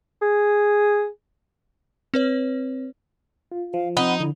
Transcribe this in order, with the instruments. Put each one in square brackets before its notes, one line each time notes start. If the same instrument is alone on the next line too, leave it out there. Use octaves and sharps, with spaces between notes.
[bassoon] G#4
[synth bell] C4 B4 C#5
[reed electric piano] F4
[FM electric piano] F3 [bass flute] F5
[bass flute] C4 [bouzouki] D#4 [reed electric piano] F#5 B5
[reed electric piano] D3 [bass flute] E4